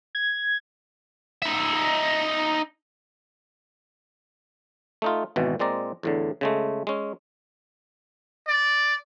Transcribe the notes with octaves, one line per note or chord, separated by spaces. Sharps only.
G#6
D#4 E5
A3 D#4 F4
G#1 B2 E3
A#2 G#3 C4 D5 A#5
E2 A2 D3
C#3 G#3 A3
G#3 C#4
D5